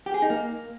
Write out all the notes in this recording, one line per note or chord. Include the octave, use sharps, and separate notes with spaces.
G4
G#4
D#4
A#3